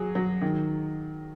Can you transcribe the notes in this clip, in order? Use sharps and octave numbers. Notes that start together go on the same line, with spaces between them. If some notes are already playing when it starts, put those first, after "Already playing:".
Already playing: F#3 G#4
F#3
D#3